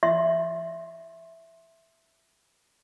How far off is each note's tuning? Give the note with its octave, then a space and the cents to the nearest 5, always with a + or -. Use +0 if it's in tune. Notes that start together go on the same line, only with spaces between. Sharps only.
E5 +0 C6 +15